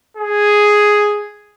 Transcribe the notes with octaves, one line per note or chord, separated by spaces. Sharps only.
G#4